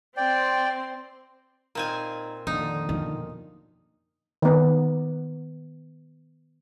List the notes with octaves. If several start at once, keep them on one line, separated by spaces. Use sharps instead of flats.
C4 D5 G5 C6
A#2 C4 D#4 A#4 G#5
F2 A#2 D3 D#3 D#4
F2 B2 D3 D#3
D#3 B3